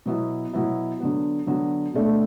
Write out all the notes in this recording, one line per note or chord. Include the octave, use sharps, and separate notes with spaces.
B2 F#3 B3 E4
B2 F#3 B3 E4
D3 F#3 B3
D3 F#3 B3
B2 A3 D4